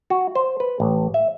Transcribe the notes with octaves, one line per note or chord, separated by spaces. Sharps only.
F#4
C5
B4
A1
E5